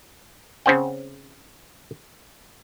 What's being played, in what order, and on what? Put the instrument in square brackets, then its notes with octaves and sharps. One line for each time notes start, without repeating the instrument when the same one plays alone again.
[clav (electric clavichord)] C#3 C4 C#4 C5 F#5 G5